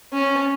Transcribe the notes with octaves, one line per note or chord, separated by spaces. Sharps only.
C#4